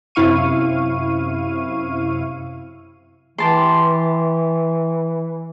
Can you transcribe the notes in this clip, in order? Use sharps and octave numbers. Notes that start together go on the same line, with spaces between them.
F#2 C3 E4 F5 C#6 D#7
E3 G4 A5 C6